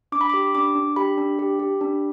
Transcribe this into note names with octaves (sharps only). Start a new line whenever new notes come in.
D4 D6
B5
G4 D6
D4 D6
D4
G4 B5
D4
G4
G4
D4